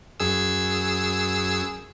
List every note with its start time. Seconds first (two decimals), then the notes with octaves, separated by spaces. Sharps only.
0.20 F#2 G#4 E6